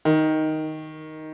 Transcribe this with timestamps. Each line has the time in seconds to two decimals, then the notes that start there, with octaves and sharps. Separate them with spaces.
0.05 D#3